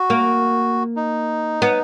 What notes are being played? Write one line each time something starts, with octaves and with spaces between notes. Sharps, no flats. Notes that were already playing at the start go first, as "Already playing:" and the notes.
Already playing: F#4
A#3
D#4
B3